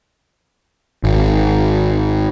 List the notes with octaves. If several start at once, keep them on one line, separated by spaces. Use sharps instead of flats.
G#1